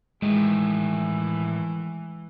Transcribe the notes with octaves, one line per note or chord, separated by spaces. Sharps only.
A2 D#3 E3 G#3